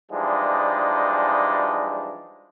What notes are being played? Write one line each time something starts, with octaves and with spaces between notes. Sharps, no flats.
E3 F3 G3 G#3 D4 D#4